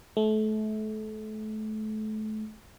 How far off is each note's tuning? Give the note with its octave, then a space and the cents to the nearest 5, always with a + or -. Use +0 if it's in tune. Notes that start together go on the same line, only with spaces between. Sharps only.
A3 -30